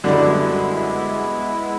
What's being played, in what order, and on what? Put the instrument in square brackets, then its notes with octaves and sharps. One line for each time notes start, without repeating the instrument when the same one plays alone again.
[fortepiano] F#2 D3 G3 [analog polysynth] G#3 B3 E4